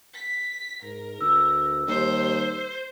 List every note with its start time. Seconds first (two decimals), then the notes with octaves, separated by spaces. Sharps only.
0.15 B6
0.82 G#2 A#4
1.21 D2 E6
1.88 D#2 G3 C5